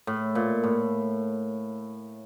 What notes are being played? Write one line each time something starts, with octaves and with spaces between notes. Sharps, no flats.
A2
A#2
A2